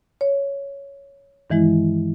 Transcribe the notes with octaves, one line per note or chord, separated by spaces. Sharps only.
C#5
G2 D#3 E3 G#3 E4